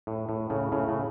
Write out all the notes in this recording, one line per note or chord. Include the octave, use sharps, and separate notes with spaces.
A2
A2
A2 C#3
A2 C#3
A2 C#3